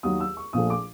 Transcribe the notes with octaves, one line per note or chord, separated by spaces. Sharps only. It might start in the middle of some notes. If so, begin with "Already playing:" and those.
D#2 D#3 F#3 D#6
E6
C#6
A#1 A#2 F3 A3 D#6
D6